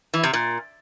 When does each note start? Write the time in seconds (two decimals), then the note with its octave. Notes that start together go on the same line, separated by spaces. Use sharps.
0.14 E3
0.24 C3
0.33 A#2